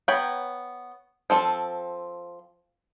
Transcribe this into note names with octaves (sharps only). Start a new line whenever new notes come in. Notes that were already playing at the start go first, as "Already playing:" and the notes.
B3 C#5 G5 A#5 B5
F3 C4 A4